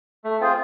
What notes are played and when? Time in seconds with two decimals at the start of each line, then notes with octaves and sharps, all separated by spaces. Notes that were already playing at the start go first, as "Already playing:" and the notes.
0.24 A3
0.40 C4 F4 G#4 C5